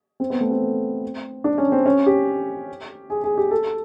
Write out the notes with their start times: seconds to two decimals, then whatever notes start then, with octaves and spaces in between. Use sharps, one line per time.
0.20 C4
0.30 B3
0.41 A3
0.51 C4
1.44 D4
1.58 C#4
1.72 C4
1.86 C#4
2.06 G4
3.10 G#4
3.24 G#4
3.38 G4
3.51 A4